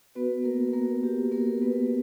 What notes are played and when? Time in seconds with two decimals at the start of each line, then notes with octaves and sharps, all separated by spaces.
0.15 B3 F#4 B4
0.44 A#3 A#4
0.73 A#3 A#4
1.03 G4
1.32 A#3 A#4
1.62 B3 B4